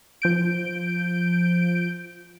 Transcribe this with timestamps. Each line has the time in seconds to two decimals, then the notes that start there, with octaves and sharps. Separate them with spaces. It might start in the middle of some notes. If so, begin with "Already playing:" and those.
0.22 F3 G6 D7